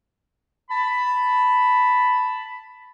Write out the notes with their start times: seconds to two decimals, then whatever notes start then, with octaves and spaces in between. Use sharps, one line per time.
0.71 A5 B5